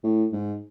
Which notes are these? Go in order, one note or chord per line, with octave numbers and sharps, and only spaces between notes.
A2
G#2